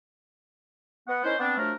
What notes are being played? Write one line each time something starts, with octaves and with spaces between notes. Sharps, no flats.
B3 F#5
C#4 D#4 E4 A#4 C5
B3 C4 D4
F3 F#3 A3 D4 A#4